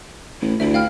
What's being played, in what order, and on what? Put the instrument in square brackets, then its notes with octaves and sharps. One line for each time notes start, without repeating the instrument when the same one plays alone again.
[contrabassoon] A1 [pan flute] E4
[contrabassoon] D2 [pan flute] E4 [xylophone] E5
[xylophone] F5 G5 F6